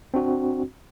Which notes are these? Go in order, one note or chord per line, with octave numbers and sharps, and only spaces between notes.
C4 D4 F#4